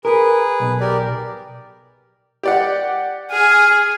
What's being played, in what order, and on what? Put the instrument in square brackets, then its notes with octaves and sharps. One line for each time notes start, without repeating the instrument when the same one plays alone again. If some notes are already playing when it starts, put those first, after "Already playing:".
[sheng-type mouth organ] G#4 B4 [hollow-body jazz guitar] A#4
[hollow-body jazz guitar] B1
[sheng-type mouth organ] G4 A#4 D5
[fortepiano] G4 D5 F#5
[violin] G#4 G#5 [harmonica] F6